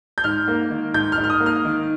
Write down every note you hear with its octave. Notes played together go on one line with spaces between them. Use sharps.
G6
G#2 F6
A#3
D#3
G#2 G6
F6
G#2
F6
D#6
A#3
F6
D#3